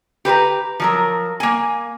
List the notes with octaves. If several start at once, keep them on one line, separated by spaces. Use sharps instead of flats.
G4 B4 C5 A#5
F3 F#3 A#4
A#3 G#5